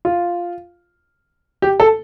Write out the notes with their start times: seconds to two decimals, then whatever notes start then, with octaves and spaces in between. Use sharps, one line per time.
0.05 F4
1.62 G4
1.80 A4